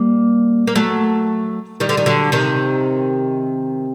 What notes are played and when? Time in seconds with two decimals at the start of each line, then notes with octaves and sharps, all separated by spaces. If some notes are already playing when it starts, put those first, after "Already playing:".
Already playing: G3 A#3
0.67 A#3
0.75 F#3 A3
1.80 D#3 G3
1.89 D3
1.97 D#3
2.06 D3 F#3
2.32 C3 D#3